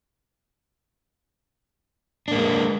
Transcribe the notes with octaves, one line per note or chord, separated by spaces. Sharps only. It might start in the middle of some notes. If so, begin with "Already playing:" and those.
G#3 A#3 D4